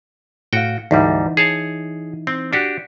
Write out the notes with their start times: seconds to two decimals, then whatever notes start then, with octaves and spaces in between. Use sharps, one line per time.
0.53 A2 F#4 F5 G5
0.91 D2 G#2 E3 G3 D#4 E4
1.37 G#4 C#5 A5
2.27 C4
2.53 D4 F#4 G4